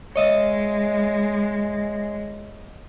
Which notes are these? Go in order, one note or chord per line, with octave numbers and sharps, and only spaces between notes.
G#3 C#5 D#5 E5